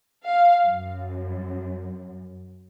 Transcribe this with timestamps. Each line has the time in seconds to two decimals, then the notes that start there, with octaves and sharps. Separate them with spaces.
0.24 F5
0.66 F#2